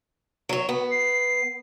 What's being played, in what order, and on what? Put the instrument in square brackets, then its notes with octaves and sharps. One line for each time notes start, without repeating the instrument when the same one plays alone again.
[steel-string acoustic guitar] F#3 C#5
B3
[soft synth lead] C7